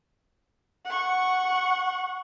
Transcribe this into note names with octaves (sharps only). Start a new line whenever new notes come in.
F#5 C#6